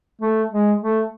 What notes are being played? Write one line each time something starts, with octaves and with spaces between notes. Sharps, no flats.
A3
G#3
A3